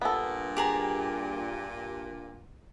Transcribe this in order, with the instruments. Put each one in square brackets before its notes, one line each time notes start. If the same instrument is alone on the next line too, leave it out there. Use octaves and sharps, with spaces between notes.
[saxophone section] G2 A#2 [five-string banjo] B3 A4
[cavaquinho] G4 G#4 A#5